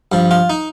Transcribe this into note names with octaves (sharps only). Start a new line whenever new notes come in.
G2 F3
F4
D#4